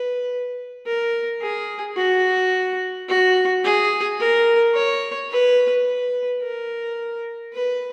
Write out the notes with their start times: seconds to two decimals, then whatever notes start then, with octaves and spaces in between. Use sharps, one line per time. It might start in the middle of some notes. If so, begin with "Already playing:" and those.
Already playing: B4
0.86 A#4
1.41 G#4
1.97 F#4
3.09 F#4
3.64 G#4
4.19 A#4
4.75 C#5
5.31 B4
5.86 B4
6.42 A#4
7.53 B4